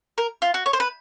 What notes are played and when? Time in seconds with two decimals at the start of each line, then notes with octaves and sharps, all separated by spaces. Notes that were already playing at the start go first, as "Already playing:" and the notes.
0.18 A#4
0.42 F4
0.54 F#4
0.66 C#5
0.73 C5
0.80 B4